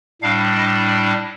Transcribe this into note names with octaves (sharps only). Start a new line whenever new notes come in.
A2 G3 D4 F5
D#5
D5